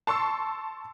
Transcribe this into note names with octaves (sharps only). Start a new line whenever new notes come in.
A5 C6 C#6 E6